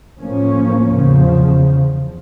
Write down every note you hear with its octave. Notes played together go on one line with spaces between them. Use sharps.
A2 F3 A#3 C#4
E2 C#3 F3